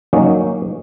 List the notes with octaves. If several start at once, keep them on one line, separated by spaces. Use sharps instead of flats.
F#3 A#3 C#4 D#4